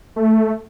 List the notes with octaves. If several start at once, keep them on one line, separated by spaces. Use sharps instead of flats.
A3